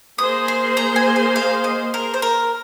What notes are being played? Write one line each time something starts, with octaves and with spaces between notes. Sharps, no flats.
A#3 G#4 C5 D#6
C6
A#5
G#5
G#5
F5
D#5
A#4
C5
A#4